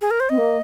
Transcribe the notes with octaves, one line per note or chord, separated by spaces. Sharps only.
G#4
A#4
C5
C4 D#5
A#3